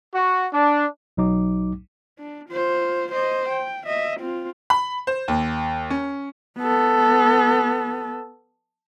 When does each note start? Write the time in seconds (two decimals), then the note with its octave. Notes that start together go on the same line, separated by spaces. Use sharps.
0.14 F#4
0.53 D4
1.17 B1 F#3 D#4 D6
2.18 D4
2.50 F4 C5
3.12 C5 D#5
3.50 G5
3.87 D#5 E5
4.20 C4 F4
4.70 B5
5.07 C5
5.28 D#2
5.90 C#4
6.58 B3 A4